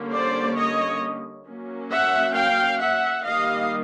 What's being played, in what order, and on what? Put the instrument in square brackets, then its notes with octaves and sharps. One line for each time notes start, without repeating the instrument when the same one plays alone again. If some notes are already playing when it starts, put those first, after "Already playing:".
Already playing: [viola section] D3 G3 A#3 C#4
C5 D5
C#5 D#5
F#3 A#3 C#4
E5 F#5
F5 G5
E5 F#5
D#3 G3 A#3 D#5 F5